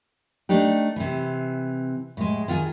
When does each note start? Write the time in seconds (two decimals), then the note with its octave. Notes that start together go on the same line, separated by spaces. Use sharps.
0.49 A3 D4 D#4 G4
0.96 C3 E3
2.17 A2 G#3
2.48 D#3 F4 F#4 G#4